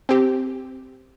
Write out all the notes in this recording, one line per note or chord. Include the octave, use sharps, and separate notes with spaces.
C4 G4